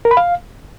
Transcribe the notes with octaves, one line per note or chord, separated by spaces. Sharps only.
A#4
B5
F5